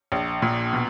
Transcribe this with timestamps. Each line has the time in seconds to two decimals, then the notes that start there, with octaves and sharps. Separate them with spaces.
0.12 A#1
0.42 A#2
0.73 B2